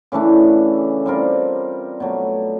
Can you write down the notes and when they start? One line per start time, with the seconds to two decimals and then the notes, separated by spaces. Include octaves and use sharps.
0.12 C#3 E3 A3 D4
1.06 G3 C4 F4 A#4
2.00 B2 F#3 A3